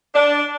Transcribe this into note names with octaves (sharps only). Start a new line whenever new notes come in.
D4